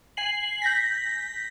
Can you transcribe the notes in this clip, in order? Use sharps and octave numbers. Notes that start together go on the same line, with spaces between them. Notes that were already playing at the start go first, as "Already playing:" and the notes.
G#5 C7 F#7
G6 A#6 B6